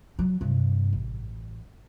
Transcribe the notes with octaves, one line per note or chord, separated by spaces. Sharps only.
F#3
G2 C3
A1